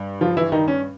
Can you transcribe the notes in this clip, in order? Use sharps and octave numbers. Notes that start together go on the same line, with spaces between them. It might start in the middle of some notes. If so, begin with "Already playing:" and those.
Already playing: G2
F3 F4
E3 E4
D#3 D#4
C#4